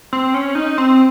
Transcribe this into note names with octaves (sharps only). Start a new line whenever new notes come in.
C4
C#4
D#4
C4